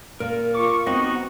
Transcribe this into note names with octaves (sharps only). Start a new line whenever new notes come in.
A#2 A#4
F4 C#6 D6
B3 C4 D#4 F#4 D#5